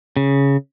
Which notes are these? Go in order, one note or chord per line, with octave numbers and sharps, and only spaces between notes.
C#3